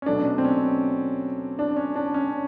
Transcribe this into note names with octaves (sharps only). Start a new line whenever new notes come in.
C#4
B2 F#3 A3 D4
C4
C#4
D4
C#4
D4
C#4